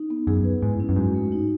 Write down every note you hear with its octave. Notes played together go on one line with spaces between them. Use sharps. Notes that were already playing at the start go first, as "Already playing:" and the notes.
Already playing: D#4
B3
F#2 G#4
B4
G#2 E4
C#4
F#2
G#2 F#4
A3
D#4